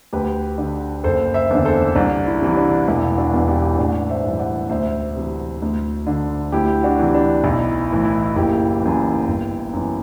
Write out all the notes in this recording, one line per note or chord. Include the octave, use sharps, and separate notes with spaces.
D2 G4 B4
D3
F#1 A4 C5
C5 E5
E2 D3
A4 C5
C2 D4
E4
C3 E3
D4
E1 E4
D4 F#4
E2 B2
E4 G4
A1 D4 F#4
C5 E5
G2 E3
D5 F#5
D2 C5 E5
C3 E3
D2
D3
D2 E4 G4
D4 F#4
C3 E3
D4
B1 E4
A2 E3
E4
F#1 E4 G4
F#2 E3
G1
F#2 E3